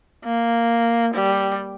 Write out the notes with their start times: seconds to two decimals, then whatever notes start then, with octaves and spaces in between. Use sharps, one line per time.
0.25 A#3
1.14 G3